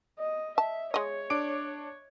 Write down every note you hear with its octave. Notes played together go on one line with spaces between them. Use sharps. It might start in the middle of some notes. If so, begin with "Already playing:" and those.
D#5
E5 A5
G#3 C#5 D#5
D4 D6 D7